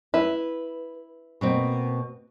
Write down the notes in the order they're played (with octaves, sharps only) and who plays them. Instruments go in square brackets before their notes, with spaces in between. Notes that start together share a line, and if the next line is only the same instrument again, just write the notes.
[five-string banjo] E4 [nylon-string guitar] B4
[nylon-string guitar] B2 A#3 C4